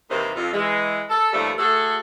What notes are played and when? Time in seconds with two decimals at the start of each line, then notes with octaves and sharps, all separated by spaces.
0.11 D#2 C3 D#3 E3 A#3 C5
0.36 F2 F4
0.52 E3 G#3
1.09 A4
1.32 D#2 F3 G3 A3
1.58 A3 F#4 G#4 A4